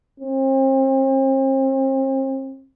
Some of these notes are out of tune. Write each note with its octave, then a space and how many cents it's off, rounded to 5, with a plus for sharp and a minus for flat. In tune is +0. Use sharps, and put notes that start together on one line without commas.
C4 +40